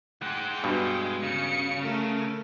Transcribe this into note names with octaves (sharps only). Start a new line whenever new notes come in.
G#3 F#5 G5
G2 B2
C#3 C#7
A3 A#4